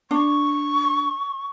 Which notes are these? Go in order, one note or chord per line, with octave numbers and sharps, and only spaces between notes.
D4 C#6